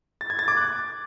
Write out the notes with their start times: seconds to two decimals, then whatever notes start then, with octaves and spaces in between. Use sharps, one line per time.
0.21 A6
0.30 G#6
0.39 A6
0.48 D6
0.57 F#6